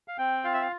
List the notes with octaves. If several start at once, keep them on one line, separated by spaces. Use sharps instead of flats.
F5
C4 G5
F4 F5
E5
F5